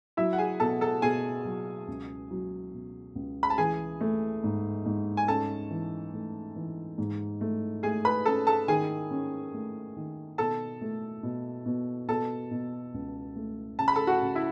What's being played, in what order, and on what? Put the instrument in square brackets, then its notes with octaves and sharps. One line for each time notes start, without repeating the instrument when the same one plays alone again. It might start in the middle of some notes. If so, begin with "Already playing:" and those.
[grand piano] F#3 [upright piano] E4 E5
[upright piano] F#5
G#4 G#5
[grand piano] B2 [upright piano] A4 A5
[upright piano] A4 A5
[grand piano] B2 [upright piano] G#4 G#5
[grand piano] F#3
C#2
F#3
B2
C#2
[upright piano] B5
A5
[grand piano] E3 [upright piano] G#4 G#5
[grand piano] A3
G#2
G#2
[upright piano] G#5
[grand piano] C#4 [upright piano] A4 A5
[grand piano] E3
A3
E3
G#2
A3
[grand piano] A3 [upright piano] G#4 G#5
[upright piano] B4 B5
[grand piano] C#4 [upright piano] A4 A5
[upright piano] A4 A5
[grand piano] D#3 [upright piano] G#4 G#5
[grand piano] C#4
A3
D#3
[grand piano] B2 [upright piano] A4 A5
[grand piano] A3
B2
B2
[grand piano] B2 [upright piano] A4 A5
[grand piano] B2
C#2
A3
[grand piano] C#3 [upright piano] A5
[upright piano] B5
A4 A5
F#4 F#5
[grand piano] C#3
[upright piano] E4 E5